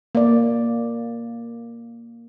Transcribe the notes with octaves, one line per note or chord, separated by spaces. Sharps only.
A#3 D5